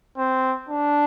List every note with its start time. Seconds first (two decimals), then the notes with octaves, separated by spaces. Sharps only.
0.17 C4
0.69 D4